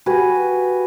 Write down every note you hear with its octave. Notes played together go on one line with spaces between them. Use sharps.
F#4 G4 B4 G#5